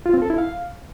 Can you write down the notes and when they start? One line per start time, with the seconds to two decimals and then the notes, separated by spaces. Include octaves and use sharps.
0.06 F4
0.14 C4
0.22 A4
0.30 E4
0.38 F5